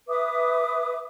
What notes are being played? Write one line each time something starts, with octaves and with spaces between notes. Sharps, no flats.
B4 E5 D6 D#6